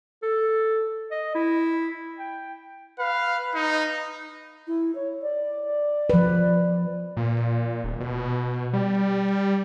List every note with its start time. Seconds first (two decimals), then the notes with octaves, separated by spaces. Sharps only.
0.23 A4
1.11 D#5
1.35 E4
2.18 G5
2.99 B4 F5
3.54 D#4
4.67 E4
4.95 C#5
5.22 D5
6.10 F3 B4
7.17 A#2
7.84 D#1
8.00 B2
8.73 G3